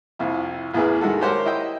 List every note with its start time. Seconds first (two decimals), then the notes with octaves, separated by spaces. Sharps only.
0.19 C2 F2 E4
0.74 A1 E2 E4 G#4 B4
1.01 D#3 G#3 F#4 A4
1.21 G4 A#4 C5 C#5 F#5
1.45 E4 D#5 G5